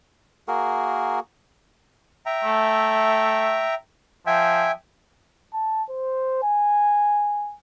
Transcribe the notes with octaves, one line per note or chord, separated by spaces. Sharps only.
A#3 F#4 G#4 A#4
E5 G5 A#5
A3
F3 E5 G5 G#5
A5
C5
G#5